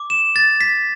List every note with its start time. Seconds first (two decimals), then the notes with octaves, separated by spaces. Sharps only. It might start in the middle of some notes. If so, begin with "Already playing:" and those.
Already playing: D6
0.10 E7
0.36 A6
0.61 B6